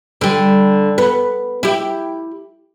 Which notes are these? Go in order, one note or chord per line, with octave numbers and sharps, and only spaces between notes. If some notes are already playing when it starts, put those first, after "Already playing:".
D3 G3
B3
E4 G4